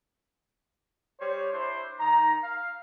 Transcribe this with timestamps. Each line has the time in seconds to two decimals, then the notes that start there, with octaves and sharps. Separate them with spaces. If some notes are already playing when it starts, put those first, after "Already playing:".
1.20 G3 C5 C#5
1.52 D4 E4 C5
1.99 D#3 D#4 A#5
2.43 F5